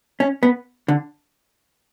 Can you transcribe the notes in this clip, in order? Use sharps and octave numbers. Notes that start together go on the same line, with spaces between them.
C#4
B3
D3